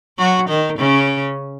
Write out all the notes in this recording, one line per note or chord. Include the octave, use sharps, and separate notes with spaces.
F#3 F#4
D#3 D#4
C#3 C#4